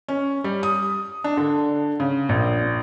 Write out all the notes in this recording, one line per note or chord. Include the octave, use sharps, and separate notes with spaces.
C#4
G3
D#6
D4
D3
C#3
A#1